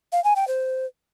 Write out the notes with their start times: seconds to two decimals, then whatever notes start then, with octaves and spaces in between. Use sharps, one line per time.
0.12 F5
0.24 G#5
0.36 G5
0.48 C5